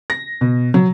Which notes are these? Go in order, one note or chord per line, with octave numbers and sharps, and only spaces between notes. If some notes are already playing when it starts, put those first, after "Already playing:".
A#6
B2
F#3